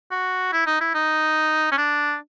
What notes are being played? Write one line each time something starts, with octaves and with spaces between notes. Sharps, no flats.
F#4
E4
D#4
E4
D#4
C#4
D4